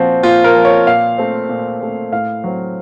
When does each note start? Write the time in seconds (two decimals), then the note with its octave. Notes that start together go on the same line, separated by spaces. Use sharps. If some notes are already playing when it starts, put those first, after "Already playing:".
Already playing: A#2 F3 C4 F#4
0.23 A#2 F4
0.44 A#4
0.55 F3 C4
0.65 C#5
0.87 A#2 F5
1.18 A3 C4
1.49 A#2
1.81 A3 C4
2.12 A2 F5
2.44 F#3 C4